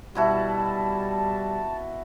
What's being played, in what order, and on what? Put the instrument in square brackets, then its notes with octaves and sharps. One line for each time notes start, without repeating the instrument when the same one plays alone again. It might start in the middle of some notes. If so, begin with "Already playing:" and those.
[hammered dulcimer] B2 E4 F#4 [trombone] G3 [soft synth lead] A5